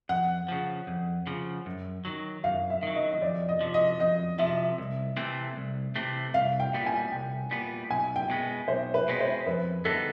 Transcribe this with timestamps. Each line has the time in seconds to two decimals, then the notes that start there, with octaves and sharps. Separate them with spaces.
0.09 F2 F#5
0.48 C#3 F3
0.87 F2
1.27 C#3 F3
1.66 F#2
2.05 D#3 F#3
2.44 F#2 F5
2.70 E5
2.83 D#3 F#3
2.95 D#5
3.12 D#5
3.21 F2 D5
3.49 D#5
3.61 C3 F3
3.74 D#5
4.00 F2 D#5
4.39 C3 F3 E5
4.78 C2
5.17 C3 E3 A3 C4
5.56 C2
5.96 C3 E3 A3 C4
6.34 C2 F5
6.60 G5
6.73 A#2 G3 B3
6.86 G#5
7.12 C2 G5
7.51 A#2 G3 B3
7.90 B1 G#5
8.16 G5
8.30 B2 G#3 B3
8.68 B1 C5
8.94 B4
9.08 B2 G#3 B3
9.20 C5
9.47 F2 B4
9.85 D3 G3 B3 D#4 A4